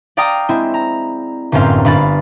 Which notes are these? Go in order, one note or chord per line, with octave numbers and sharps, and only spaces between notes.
D5 F5 G5 A#5 D#6 E6
G#3 C4 E4
A#5
G1 F#2 A2 C4 F5 C6
G1 F5 B5 A6